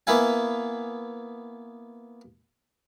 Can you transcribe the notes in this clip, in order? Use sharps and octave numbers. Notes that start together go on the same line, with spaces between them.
A#3 B3 E4 F5 G#5